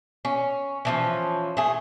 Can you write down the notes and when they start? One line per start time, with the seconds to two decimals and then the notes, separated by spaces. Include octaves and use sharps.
0.25 C#4
0.85 E3 F3 C#4
1.57 A3 G#4